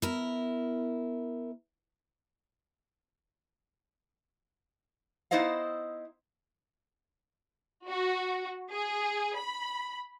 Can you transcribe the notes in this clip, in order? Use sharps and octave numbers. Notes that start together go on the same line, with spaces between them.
B3 E4 A#4
B3 D#4 E4 C5 D#5 F5
F#4
G#4
B5